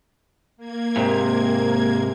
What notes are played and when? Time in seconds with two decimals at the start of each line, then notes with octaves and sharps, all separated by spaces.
0.57 A#3 G#6
0.96 G#2 C3